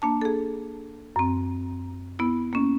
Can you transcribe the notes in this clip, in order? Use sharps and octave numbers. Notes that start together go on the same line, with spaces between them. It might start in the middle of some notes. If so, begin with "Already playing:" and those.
A#3 D4 A5
G#4 A4
F#2 C4
B3 E4
A#3 C#4